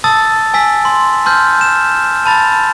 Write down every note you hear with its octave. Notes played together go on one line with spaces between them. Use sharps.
A5 D#6 E6 A6
G#5 E6 B6
C6
A5 C6 F6 G6
E7
A5 B5 A6